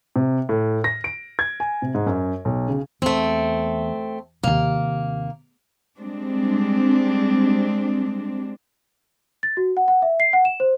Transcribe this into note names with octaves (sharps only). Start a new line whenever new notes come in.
C3
A2
A#6
D7
G#6
G#5
C3
G#2
F#2
B1
C#3
E2 A3 C4
D#2 C3 A#3
G3 G#3 C4 D4
A6
F#4
F#5
F#5
E5
C7
F#5
E7
C5